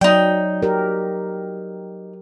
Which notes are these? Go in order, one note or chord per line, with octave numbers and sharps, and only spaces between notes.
F#3 D#4 D5 G5
G4 A#4